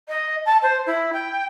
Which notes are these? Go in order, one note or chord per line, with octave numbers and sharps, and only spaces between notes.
D#5
A5
C5
E4
G5